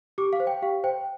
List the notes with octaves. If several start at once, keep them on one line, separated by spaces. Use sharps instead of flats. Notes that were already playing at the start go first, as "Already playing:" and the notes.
G4 D6
F5
C5
G5
G4 F5
C5 G5